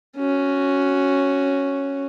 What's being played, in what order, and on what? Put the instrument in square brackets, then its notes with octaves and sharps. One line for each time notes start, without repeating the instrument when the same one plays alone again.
[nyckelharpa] C#4 F#4